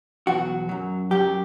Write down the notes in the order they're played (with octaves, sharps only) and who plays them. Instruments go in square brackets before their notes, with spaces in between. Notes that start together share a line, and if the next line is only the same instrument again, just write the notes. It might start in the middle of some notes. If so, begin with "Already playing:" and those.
[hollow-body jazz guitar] E2 B2 F#3 F#4
F#2 F#3
F#2 F#3 G4